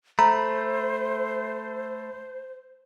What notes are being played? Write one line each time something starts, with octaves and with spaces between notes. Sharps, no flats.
A3 C5 A#5 B5